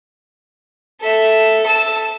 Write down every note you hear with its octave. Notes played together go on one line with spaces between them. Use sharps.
A4 E5
A5 E6